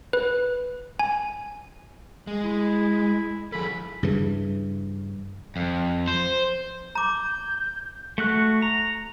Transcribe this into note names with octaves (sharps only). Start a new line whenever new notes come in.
B4
G#5
G#3
E4
F3 G#4 A4 B5
G2 C#3 E3
F2
C5
A#5 D6 G6
A3 F#4 F#6
A#5